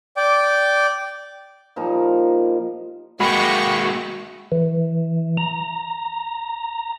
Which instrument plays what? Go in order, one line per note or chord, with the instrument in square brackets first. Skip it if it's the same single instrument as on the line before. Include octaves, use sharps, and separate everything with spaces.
[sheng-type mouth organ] D5 G5 D6
[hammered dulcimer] A#2 F3 G3 D#4
[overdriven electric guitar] G#3 A#3 [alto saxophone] F#4 [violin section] D#5 G5 C#6 [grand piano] B5
[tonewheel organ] E3
A#5